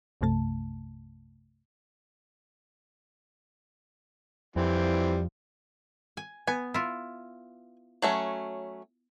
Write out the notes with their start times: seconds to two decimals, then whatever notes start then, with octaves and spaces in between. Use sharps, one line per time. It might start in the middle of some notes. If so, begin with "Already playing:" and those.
0.21 B1 F#2 C3 A3 A5
4.56 F2 E3 G3 C4
6.17 G#5
6.47 B3 G#5
6.74 E4 F4
8.02 F#3 A3 C#4